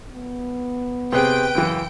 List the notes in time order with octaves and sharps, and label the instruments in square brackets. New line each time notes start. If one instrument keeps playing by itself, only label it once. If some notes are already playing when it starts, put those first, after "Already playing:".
[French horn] B3
[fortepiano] C3 G#4 C5 [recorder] B4 [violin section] G5 D7
[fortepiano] F#2 C#3 E3